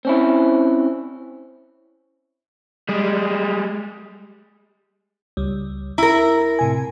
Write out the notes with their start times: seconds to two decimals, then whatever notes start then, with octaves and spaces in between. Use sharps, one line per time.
0.05 C4 C#4 E4
2.89 G3 G#3
5.37 C#2 G3
5.98 E4 A#4 A#5
6.59 A2 C3 G#5